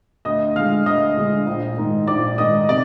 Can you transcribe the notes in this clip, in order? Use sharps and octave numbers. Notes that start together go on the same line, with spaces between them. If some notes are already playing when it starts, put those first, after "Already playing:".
D2 D#5 D#6
D3 G#3 F5 F6
D2 D#5 D#6
D3 G#3
A#1
G#2 D#3
A#1 D5 D6
G#2 D#3 D#5 D#6
C3 D5 D6